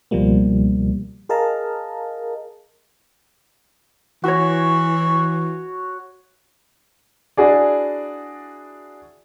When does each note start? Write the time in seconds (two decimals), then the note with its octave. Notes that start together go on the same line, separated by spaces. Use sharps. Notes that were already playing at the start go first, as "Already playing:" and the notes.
0.11 C#2 B2 F3 G3 A#3
1.29 G#4 A#4 D#5 F5 A5 A#5
4.24 E3 F#4 C#5
7.37 D4 E4 F#4 G#4 D5